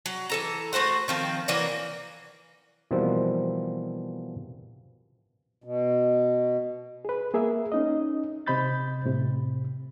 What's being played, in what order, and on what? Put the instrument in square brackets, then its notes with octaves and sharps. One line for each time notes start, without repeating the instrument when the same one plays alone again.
[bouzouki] F#3
E3 A4 A#5
A3 F#4 C5 F#5
D#3 F3 C4
E3 F#3 A#3 D5
[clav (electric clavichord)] B2 E3 F3 G3 A#3 C4
[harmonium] B2
[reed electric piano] G#4 B4
A#3 G#4 A#4 E5
C#4 D#4 D#5
C3 C5 D#5 B5 G6 A6
A2 C3